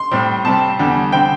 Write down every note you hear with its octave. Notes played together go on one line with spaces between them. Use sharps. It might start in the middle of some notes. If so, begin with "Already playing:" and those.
Already playing: C6
A2 G3 C4
C3 G3 C4 A5
E2 D3 G3
D3 C4 G5